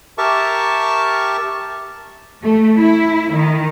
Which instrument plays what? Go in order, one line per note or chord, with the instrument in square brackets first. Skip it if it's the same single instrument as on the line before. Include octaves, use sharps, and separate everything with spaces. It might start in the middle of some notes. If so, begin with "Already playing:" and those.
[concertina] G4 A#4 E5 A5 C#6
[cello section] A3
E4
D#3